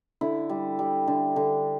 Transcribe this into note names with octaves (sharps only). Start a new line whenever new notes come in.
D3 E4
G3
G3
D3
D3